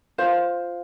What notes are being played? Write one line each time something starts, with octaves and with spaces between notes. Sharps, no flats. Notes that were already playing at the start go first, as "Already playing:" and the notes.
F4 C5 F5